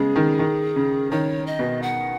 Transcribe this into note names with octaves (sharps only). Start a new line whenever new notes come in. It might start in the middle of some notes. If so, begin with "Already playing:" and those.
Already playing: C#3 G#3 B3 G#4
D#3
D#3
C#3
D#3 C#5
D#5
B2
F#5